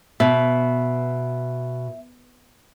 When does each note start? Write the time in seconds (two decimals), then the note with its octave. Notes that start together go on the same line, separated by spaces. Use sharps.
0.20 B2 E5